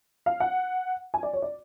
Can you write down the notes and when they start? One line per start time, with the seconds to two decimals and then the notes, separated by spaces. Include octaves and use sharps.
0.26 F5
0.40 F#5
1.14 G#5
1.23 D5
1.33 C#5
1.42 D5